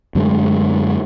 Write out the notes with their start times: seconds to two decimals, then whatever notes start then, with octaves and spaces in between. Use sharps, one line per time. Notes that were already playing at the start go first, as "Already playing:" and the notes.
0.15 F#2 D3 G#3 A3